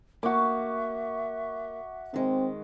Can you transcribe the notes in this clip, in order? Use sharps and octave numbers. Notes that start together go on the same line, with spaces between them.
A#3 F#4 E5 D6
D#3 G#3 C4